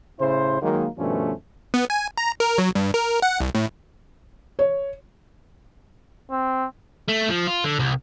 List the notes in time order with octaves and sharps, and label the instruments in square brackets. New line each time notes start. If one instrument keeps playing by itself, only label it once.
[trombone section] A2 C#3 E4 C5
D#3 F#3 G#3 A#3
G2 B2 D#3 F3 A3 C#4
[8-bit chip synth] B3
G#5
A#5
A#4
F#3
G2
A#4
F#5
C2
A2
[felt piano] C#5
[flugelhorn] C4
[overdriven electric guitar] A3
F3
F4
D3
C2